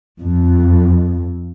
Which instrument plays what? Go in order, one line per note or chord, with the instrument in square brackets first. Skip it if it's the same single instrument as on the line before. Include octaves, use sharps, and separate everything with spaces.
[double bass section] F2